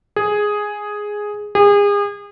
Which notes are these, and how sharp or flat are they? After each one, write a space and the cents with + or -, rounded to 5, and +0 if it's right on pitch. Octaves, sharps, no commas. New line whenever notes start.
G#4 +0
G#4 -35